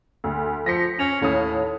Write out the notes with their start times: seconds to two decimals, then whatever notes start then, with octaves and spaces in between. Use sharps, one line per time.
0.24 D2
0.66 F3 A#6 B6 C#7
0.99 C#4 F7
1.21 D#2 A2 C#4 D#6